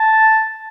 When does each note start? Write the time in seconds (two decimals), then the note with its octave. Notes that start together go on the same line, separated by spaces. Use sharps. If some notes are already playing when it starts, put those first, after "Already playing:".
Already playing: A5